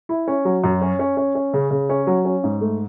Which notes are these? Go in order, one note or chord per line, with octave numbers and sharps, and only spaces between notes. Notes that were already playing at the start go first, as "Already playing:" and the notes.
E4
C#4
F#3
F#2
C#4
C#4
C#4
C#4
C#3
C#3
C#4
F#3
C#4
G#2
A3